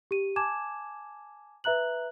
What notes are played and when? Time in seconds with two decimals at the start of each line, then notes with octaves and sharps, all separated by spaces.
0.11 G4 D#7
0.36 G#5 A5 D6 G#6 E7
1.64 B4 E5 A#5 F#6 F#7